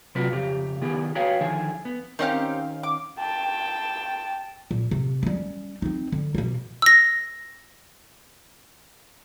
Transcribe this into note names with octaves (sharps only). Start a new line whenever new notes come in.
C3 F#3 C4 F4 F#4 B4
F2 C#3 G4
D#3 B3 E4 G4 G#4
F#4 G#4 B4 C#5 F5 G5
D3 D#3 F3 E4 G#4
B3
D#3 C4 C#4 D#4 G4 F5
D6
G5 A5
A#2
C3
G3 C#4
C4 D#4
D3
B2 A#3
E6 A#6